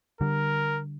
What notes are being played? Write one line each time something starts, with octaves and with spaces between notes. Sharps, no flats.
D3 G3 A#4